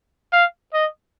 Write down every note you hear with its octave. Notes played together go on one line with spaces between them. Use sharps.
F5
D#5